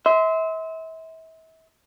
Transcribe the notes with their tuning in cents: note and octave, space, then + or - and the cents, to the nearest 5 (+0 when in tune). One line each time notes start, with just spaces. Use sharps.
E5 -35 C6 -15